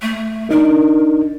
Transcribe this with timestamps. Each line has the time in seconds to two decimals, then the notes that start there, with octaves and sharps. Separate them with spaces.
0.02 A3
0.51 D4 D#4 A#4